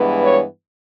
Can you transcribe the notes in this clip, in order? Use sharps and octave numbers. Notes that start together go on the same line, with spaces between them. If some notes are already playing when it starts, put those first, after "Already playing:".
Already playing: G2 E3 G#3 B3
C#5